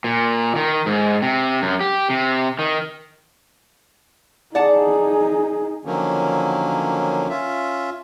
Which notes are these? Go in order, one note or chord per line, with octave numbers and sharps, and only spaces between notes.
A#2
D#3
G#2
C3
F#2
G4
C3
D#3
D#4 G#4 D5 F#5 A5
D3 D#3 F3 F#3 A#3 C#4
C#4 F4 E5